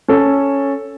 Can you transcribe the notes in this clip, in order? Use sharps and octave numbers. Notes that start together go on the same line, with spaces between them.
C#4 A4